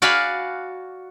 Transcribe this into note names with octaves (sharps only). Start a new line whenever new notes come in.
F#4 D5 F5 G#5 B5